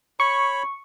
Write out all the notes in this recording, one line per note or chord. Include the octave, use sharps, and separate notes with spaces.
C#5 B5 C#6